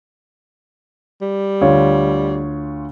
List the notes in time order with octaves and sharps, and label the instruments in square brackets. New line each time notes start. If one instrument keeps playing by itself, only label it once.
[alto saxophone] G3
[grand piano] D2 F4 C#5